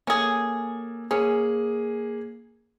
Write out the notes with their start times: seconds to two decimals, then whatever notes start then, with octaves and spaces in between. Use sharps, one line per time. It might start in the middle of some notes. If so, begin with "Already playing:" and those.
0.07 A#3 C#4 G#4 A4
1.11 A#3 C#4 G#4